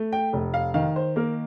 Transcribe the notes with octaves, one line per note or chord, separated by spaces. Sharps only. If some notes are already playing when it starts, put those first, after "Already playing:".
Already playing: A3
G5
F1
F5
D#3 F5
C5
A#3 A#4